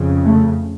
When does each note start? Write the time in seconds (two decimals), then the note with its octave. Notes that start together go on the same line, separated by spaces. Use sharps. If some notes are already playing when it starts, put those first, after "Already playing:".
Already playing: F2 C#3
0.24 A3